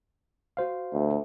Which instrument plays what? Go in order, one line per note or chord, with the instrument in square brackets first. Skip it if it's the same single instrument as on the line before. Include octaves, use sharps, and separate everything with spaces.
[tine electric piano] F#4 C5 F5
[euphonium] D2